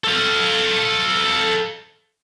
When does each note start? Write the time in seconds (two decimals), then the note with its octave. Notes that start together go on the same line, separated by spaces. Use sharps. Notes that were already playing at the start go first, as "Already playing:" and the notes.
0.04 A4 F5